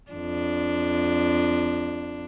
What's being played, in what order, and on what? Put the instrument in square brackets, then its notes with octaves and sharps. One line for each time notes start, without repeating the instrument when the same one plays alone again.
[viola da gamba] F2 D4